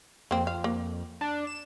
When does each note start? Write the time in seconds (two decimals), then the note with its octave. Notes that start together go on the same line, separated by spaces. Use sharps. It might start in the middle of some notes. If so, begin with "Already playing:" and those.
0.31 F2 A#3 C4
0.47 F5
0.64 A#3
1.21 D4
1.47 E7